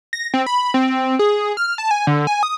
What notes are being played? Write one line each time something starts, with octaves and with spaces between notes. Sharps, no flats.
A#6
C4
B5
C4
G#4
F6
A5
G#5
D3
G#5
D#6